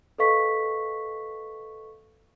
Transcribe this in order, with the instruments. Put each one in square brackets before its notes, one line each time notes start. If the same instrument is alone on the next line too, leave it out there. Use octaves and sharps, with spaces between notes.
[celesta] A4 B4 D#5 F5 C#6 B6